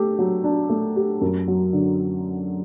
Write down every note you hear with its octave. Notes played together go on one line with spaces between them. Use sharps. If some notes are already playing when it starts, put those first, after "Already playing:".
Already playing: A3 D4 G4
F#3
D4
A3
G4
F#2
F#3
D3